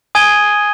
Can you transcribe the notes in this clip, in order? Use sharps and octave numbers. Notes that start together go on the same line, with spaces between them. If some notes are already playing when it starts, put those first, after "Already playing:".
G#5 D#6 G#6 D#7 G7